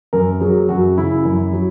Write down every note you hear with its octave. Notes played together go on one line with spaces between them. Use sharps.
F#2 A#4
F#3 G#4
F#2 F#4
C#3 E4
F#2
F#3